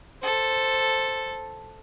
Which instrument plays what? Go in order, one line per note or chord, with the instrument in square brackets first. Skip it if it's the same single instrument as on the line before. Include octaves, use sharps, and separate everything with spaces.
[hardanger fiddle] A4 C5